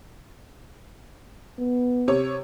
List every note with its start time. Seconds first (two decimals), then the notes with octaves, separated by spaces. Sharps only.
1.59 B3
2.08 C3 C#5